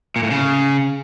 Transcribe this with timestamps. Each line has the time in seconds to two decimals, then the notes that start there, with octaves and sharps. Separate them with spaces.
0.16 A#2
0.23 A2
0.31 C#3